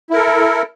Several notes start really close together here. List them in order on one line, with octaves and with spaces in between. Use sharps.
E4 A#4 A4